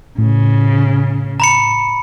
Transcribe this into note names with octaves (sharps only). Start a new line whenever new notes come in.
A2 C#3
A#5 B5 C#7